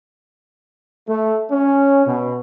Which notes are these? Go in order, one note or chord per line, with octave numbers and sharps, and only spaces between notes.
A3
C#4
B2